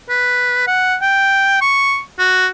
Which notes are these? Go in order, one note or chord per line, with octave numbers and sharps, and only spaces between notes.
B4
F#5
G5
C#6
F#4